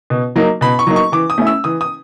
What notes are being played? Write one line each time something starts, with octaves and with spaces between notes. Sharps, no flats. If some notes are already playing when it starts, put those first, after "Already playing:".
B2
F#3 A#3 D#4
B2 B5
C#6
F#3 A#3 D#4
C#6
E3 D6
D#6
A3 C#4 E4
E6
E3 D#6
D#6